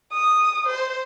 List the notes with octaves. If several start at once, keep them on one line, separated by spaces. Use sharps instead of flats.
D#6
C5